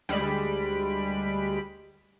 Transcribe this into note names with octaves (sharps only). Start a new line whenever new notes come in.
D2 G3 G#3 B5 D7